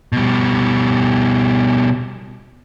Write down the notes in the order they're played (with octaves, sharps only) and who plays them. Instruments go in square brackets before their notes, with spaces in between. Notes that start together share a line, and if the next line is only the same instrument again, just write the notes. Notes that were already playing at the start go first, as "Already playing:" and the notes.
[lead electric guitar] B2 G3